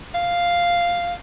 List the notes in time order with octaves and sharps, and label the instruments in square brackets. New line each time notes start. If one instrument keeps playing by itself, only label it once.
[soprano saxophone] F5